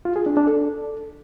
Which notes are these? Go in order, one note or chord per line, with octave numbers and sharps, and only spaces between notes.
F4
G#4
D4
D4
A4